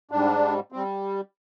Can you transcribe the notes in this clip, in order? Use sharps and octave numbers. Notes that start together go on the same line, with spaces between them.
G#2 G3 D4
G3 C4